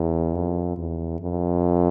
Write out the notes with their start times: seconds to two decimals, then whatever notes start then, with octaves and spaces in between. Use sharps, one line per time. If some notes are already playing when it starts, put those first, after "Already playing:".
Already playing: E2
0.35 F2
0.78 E2
1.21 F2